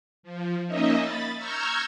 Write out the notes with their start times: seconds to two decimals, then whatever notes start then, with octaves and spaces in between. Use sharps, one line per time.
0.23 F3
0.67 A#3 C#4 D#4 D#5 E5
1.01 B5 A6
1.37 A#5 C#6 E6 F6 G6 G#6